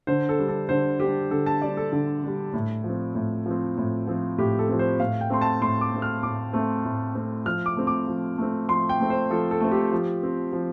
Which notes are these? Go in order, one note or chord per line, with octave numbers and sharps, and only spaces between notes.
D3 C5
A4
G3 D4
A4
D3 C5
G3 G4
D4
D3 A4
A5
G3 D4 D5
A4
D3 A4
G3 D4
A2
F3
C4
A2
F3 C4
A2
F3 C4
A2 G4
A4
F3 C4
C5
A2 F5
G5
A3 C4 C6
A5
A2 C6
D6
A3 C4
F6
A2 D6
A3 C4
A2
A3 C4
F3 F6
D6
A3 C4
D6
F3
A3 C4
F3 C6
G5
A3 C4
C5
F3 A4
A4
A3 C4
G4
F3
C4
F3